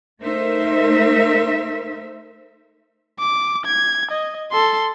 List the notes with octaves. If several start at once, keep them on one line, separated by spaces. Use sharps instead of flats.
A3 D#4 A#4 C5 E5
D6
G#6
D#5
A4 C6